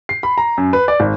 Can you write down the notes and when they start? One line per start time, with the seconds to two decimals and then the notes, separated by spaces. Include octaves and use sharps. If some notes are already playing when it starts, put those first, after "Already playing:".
0.09 C7
0.23 B5
0.38 A#5
0.58 F#2
0.73 B4
0.88 D5
1.00 G#1